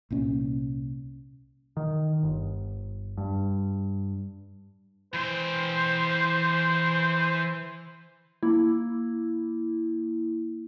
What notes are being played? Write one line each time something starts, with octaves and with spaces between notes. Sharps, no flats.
C2 A#2 C#4
D#3
G1
G2
E3 C5 G5
A#3 E4